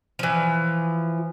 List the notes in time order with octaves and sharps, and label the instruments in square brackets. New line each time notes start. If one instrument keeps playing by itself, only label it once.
[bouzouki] E3 F3